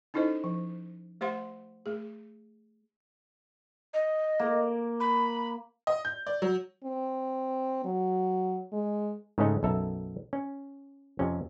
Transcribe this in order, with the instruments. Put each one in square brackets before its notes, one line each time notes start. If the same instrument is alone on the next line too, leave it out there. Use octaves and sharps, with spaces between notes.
[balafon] C#4 D#4 E4 A4 C5 D#5
F3
A3 G4 C5 F5 F#5 C6
A3 G#4
[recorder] D#5
[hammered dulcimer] A#3
[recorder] B5
[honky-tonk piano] D#5
G6
D5
F#3
[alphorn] C4
F#3
G#3
[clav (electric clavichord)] G#2 C#3 G#3 A3 C#4 D#4
B1 F#2 A4 E5 A#5
C#4
F2 C3 C#4